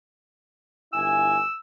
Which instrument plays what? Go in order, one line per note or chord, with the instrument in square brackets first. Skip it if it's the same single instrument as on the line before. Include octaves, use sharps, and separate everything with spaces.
[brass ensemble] G1 E4 G#5 [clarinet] E6